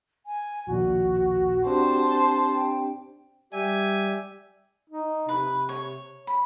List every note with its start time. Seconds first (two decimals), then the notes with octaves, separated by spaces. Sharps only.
0.26 G#5
0.67 A#1 D#2 A#2 F#4
1.67 C4 D4 G4 C5 A5
2.55 G5
3.53 G3 G4 E5 G#5
4.90 D#4
5.29 C3 B4
5.69 C#5
6.27 B5